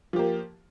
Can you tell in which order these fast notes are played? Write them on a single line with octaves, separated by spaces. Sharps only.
F3 G4 A#3